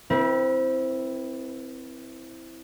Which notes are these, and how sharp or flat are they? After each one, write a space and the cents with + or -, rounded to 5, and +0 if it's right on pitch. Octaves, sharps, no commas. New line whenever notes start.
C4 +0 E4 +0 B4 -40